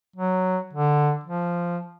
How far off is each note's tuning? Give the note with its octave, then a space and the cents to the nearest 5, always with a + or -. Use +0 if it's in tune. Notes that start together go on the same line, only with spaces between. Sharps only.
F#3 +0
D3 +5
F3 -5